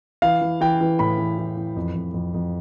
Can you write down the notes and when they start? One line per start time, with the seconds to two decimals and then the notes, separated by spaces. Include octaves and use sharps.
0.22 E3 F5
0.41 E3
0.61 E3 G5
0.81 E3
0.99 A2 B5
1.18 E3
1.38 E3
1.57 E3
1.76 F2
1.95 F2
2.14 F2
2.34 F2